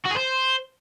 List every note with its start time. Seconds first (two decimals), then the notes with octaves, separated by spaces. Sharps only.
0.06 F#4
0.11 G#4
0.17 C5